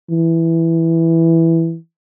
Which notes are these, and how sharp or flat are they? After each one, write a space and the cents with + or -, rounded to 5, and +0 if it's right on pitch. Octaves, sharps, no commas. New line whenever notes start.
E3 +0